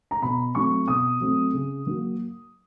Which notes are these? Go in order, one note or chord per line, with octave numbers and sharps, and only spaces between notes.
A#5
B2 B5
F#3 A3 C4 C#6
B2 D#6
F#3 A3 C4
C#3
F#3 A#3